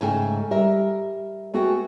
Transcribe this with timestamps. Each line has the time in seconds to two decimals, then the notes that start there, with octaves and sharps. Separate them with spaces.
0.01 G#2 C#3 A3 G5 G#5
0.51 G3 A#4 E5
1.54 A3 B3 F#4 G#4 G5